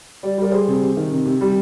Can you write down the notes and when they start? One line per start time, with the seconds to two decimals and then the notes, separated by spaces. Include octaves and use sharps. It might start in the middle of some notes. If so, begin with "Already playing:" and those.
0.23 G3 D5
0.38 G3 A#4 D5
0.52 G3 G#4 C5
0.67 C3
0.82 C3
0.97 D#3
1.12 C3
1.26 C3
1.41 G3